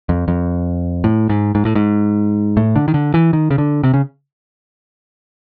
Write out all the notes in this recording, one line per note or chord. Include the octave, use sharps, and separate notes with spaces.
F2
F2
A2
G#2
G#2
A2
G#2
A2
D3
D#3
D3
E3
D#3
C#3
D3
C3
C#3